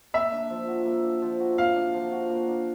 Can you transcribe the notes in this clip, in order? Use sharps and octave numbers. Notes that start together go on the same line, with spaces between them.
A#3 E5
D4
F3
F#4
A#3
D4
F3
F#4
A#3 F5
D4
F3
F#4
A#3
D4